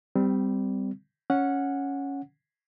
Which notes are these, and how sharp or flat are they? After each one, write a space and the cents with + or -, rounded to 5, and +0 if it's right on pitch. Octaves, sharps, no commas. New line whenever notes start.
G3 +0 C4 -25
C#4 +0 F#5 -15